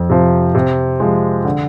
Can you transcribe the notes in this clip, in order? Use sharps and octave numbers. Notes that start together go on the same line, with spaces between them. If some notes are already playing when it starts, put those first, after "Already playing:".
Already playing: F2
C3 F3
C3
F3 G#3
D3